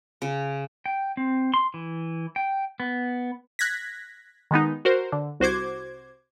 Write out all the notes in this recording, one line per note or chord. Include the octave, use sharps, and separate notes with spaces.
C#3
G5
C4
C6
E3
G5
B3
F#6 G#6 A#6 B6
D#3 G#3 B3 D#4
F#4 A#4 C5
D3
C2 F#4 C5 D6 G#6